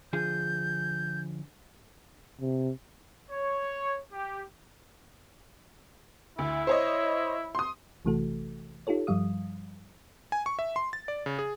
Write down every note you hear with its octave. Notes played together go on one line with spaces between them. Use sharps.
D3 F3 G#4 G6
C3
C#5
G4
D2 E4
C5 C#5 D#5
C6 D#6
A1 C3 E3 A3 F#4 A4
D#4 F4 G4 A4 C#5
G2 F3 G3 F5 D#6
G#5
C#6
E5
C6
A6
D5
C#3
G#4